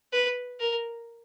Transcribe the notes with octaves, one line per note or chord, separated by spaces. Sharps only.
B4
A#4